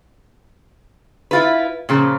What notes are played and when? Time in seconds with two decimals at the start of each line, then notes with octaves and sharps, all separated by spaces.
1.31 E4 F4 B4
1.89 A#2 C#3 F3